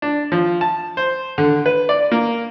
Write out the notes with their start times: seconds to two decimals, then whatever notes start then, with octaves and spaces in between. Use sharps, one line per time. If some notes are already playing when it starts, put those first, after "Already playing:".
0.02 D4
0.32 F3
0.61 A5
0.97 C5
1.38 D3
1.66 B4
1.89 D5
2.12 A#3